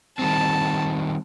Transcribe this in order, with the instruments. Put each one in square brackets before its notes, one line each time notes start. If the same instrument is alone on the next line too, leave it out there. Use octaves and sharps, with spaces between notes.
[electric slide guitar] D#3 G3 C4 [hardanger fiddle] A5